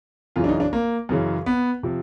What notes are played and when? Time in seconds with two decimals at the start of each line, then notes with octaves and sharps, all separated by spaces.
0.36 F#2 C#3 E3 F4
0.44 D4
0.49 D#4
0.60 D4
0.73 A#3
1.09 F#2 C#3 E3 G#3
1.46 B3
1.83 C3 F3